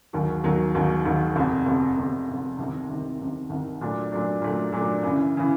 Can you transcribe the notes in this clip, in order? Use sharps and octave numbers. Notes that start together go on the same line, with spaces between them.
E1 D#2 D#3 F#3
E1 D#2 D#3 F#3
E1 D#2 D#3 F#3
E1 D#2 D#3 F#3
F1 F2 C3
F1 F2 C3
F1 F2 C3
F1 F2 C3
C2 C3 D#3
C2 C3 D#3
C2 C3 D#3
C2 C3 D#3
A#2 F#3 A3 D4
A#2 F#3 A3 D4
A#2 F#3 A3 D4
A#2 F#3 A3 D4
F#2 C#3 E3
C#3 E3